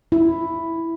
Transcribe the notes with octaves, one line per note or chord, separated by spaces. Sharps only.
E4